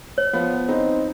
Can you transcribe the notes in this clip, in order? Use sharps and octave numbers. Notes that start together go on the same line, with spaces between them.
C#5
F3 B3
C4 D#4